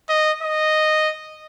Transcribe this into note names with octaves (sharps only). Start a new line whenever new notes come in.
D#5
D#5